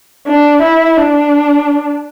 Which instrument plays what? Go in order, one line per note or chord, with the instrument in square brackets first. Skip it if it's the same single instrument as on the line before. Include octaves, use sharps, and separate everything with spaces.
[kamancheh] D4
E4
D4